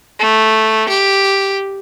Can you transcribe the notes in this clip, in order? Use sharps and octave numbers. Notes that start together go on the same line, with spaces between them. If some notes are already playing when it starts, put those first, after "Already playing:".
A3
G4